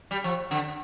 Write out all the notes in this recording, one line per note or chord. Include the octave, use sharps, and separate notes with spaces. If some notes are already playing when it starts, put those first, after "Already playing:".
G3
F3
D3